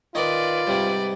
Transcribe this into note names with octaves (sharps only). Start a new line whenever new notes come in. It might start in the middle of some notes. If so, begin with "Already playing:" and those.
D#3 F4 B4 D5 D#5 C6
G#2 C3 G3